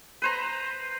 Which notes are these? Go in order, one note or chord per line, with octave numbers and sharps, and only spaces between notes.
B4 C5 A#5